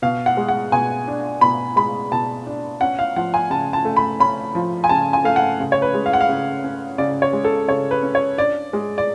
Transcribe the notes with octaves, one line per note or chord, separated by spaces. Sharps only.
B2 F5
F#5
G#3
F#5
B2 G#5
D4
B2 B5
G#3 B5
B2 A5
D4
C#4 F#5
F5
F3 F#5
G#5
C#3 A5
A5
A3
B5
C#4 B5
F3
G#5
C#3 A5
G#5
A3 F5
F#5
C#3
C#5
B4
G#3
F5
F#5
F5
C#3
C#4
C#3 D5
C#5
G#3
A4
C#3 C#5
B4
C#4
C#5
D4 D5
G#3
D5